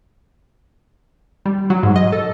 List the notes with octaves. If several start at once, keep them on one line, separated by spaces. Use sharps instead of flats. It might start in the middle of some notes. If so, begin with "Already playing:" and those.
G3
F#3
G#2
D#5
A4